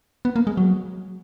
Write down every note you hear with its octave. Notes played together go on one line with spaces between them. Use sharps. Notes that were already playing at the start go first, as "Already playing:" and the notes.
B3
A#3
G#3
F#3